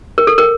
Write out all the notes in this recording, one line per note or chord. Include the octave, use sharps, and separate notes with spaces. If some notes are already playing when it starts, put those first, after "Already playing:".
A#4
A4
A#4